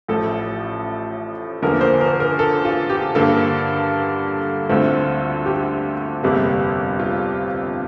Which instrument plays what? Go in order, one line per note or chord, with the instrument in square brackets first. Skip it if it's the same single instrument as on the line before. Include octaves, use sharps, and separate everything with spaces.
[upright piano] A1 A2 F3 A4
E2 D3 F3 A#3 A#4
C5
A#4
A#4
A4
F4
G4
G2 D3 G3 A#3 A4
D2 D3 A3 C4 F4
G4
G1 F2 C3 G3 A#3
F4